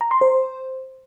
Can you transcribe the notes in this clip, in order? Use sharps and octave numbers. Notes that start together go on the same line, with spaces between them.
A#5
C6
C5